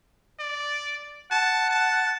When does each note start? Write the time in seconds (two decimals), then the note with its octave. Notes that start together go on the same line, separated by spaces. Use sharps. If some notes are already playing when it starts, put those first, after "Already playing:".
0.40 D5
1.31 F#5 A5
1.71 A5